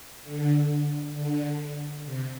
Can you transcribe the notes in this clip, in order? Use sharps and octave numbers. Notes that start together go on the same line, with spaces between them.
D3
D3
C3